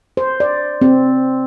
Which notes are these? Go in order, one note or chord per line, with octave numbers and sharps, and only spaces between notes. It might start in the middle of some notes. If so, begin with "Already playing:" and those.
C5
D5
C4